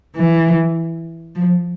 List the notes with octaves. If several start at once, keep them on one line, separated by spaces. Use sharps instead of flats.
E3
F3